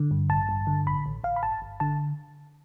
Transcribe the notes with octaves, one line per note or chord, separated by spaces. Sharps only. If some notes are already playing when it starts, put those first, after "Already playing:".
Already playing: D3
G2
A1 A5
G2
D3
A1 B5
A1
A1 F5
B5
G1 A5
G1
D3 A5